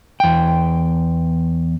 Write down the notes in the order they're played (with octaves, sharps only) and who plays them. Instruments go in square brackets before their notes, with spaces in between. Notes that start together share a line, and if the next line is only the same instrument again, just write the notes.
[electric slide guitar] E2 G5